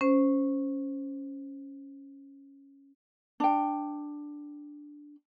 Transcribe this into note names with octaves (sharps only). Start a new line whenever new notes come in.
C#4 C5
D4 G5